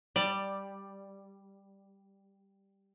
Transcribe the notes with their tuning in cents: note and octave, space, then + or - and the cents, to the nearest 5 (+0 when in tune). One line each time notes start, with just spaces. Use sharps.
G3 +0 D5 +10